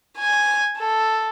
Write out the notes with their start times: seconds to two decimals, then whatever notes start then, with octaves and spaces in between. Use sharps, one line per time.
0.18 G#5
0.77 A4